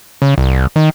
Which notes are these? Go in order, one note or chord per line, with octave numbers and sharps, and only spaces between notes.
C#3
C2
D#3